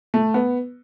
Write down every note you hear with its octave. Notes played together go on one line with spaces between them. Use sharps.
A3
B3